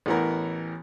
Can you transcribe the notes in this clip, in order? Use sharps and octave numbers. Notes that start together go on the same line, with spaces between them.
A1 A2 E3 B3 A#4